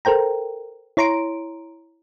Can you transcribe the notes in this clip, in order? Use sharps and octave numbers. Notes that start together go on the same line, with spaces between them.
A4 A#4 C5 G5 A#5
E4 C#5 A#5 C6 D7